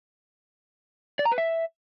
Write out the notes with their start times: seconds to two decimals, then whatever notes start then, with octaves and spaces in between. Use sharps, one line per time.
1.19 D5
1.25 A#5
1.32 B4
1.38 E5